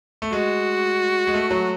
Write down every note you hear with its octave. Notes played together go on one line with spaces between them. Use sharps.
A3
G#3 F#4
G#3
A3
F#3